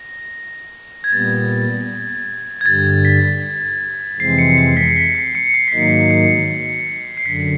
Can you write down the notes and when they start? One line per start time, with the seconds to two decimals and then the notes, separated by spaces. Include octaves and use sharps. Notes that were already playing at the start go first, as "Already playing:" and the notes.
Already playing: A#6
1.04 G#6
1.13 A#2 G3 B3 A6
2.61 G#6
2.66 G2 D3 G3 A6
3.05 B6
4.19 F2 C3 E3 G#3 C4 C7
4.38 C#7
4.58 C7
4.77 B6
4.96 B6
5.15 C7
5.35 C#7
5.54 C7
5.68 B6
5.72 G#2 D#3 F#3 A#3 D#4 C7
5.91 C7
6.11 C#7
7.17 C7
7.26 F#2 D3 B6